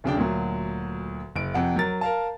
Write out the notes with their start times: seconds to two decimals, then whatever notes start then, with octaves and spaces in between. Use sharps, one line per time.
0.04 D1 C#3 D4 G5
0.17 D2 A#2 F#3
1.36 F#1 D7
1.54 F2 C3 F#5
1.76 F#3 A#4 A6
2.01 A#4 F5 A5